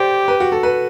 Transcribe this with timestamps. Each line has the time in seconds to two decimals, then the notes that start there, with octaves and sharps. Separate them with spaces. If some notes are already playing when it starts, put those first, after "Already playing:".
Already playing: G4 C5 D5
0.28 B4
0.40 F#4
0.52 A4
0.63 B4